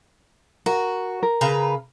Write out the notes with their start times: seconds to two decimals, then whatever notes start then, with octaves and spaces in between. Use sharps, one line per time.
0.66 F#4 A#4
1.23 A#4
1.41 C#3 B4 A#5